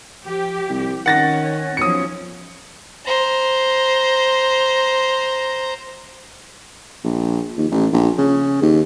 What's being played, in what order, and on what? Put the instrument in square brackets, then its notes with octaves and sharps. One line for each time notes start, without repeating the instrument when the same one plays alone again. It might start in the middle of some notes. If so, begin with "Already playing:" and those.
[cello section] F3 G4
[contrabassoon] C2
[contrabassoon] D#3 [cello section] C#4 [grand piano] F#5 A6 A#6
[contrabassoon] B1 [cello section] F3 F#3 C#4 [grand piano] D#6 C#7
[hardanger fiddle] C5 A#5
[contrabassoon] A#1
D#2
A1
A#1
C#3
D#2